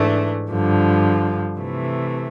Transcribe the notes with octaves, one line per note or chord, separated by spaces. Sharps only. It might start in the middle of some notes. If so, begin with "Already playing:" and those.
Already playing: G#2 E3 A3 D4
G2 D3 F3
C3 E3 A3